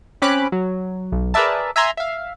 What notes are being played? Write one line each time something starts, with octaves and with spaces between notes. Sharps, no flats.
C4 C#4 B5 D6 F#6
F#3
B1
G#4 A#4 B4 D5 E5 A5
E5 G#5 A#5 C6
E5 F5